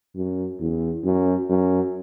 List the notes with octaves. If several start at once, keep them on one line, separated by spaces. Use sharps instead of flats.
F#2
E2
F#2
F#2